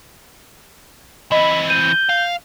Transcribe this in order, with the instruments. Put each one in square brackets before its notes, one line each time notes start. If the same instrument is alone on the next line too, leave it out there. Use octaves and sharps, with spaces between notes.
[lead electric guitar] E3 C4 [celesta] D#5 [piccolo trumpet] B5
[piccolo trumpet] G6 [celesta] D#7
[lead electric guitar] F5